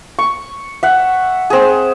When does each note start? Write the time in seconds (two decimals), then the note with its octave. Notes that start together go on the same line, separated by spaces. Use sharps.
0.19 C#6
0.83 E5 F#5
1.50 C4 G#4